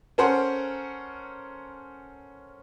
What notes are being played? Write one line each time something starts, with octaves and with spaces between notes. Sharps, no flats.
C#4 A4 A#4 C5 F#5